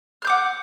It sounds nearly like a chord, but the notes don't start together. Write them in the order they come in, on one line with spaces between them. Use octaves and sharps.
F6 G6 D6 F#5